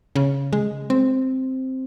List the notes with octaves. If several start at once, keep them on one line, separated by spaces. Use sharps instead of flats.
C#3
G#3
C4